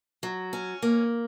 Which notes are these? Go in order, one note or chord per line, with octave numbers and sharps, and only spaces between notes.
F#3
C#4
A#3